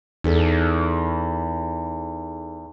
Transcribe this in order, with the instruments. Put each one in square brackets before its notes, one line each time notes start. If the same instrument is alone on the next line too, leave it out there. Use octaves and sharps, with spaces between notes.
[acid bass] E2 [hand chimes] D#4 G#4 A4